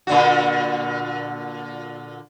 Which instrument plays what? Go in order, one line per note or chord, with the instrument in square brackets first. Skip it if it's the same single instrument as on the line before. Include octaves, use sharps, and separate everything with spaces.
[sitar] A#2 D3 F#4